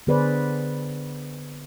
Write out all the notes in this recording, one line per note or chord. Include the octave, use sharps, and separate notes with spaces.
D3 B3 G#4 B4 C5 D5